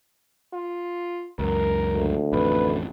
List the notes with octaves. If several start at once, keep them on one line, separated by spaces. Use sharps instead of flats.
F4
C#2 F#2 A#4
D2
A1 F2 B4